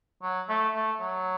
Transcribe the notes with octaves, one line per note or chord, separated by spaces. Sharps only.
F#3
A3
A3
F#3